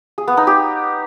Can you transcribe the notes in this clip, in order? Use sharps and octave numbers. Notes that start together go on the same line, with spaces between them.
G#4
B3
D#4
G4